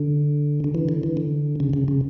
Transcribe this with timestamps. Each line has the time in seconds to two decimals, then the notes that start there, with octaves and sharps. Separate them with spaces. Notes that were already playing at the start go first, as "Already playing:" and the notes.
Already playing: D3
0.64 D3
0.75 E3
0.89 D3
1.03 E3
1.17 D3
1.60 C#3
1.73 C#3
1.88 C#3